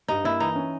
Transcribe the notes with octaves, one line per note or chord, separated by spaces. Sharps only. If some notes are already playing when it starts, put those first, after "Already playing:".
G2 D#4
A#3 E4
E3 D#4
C#4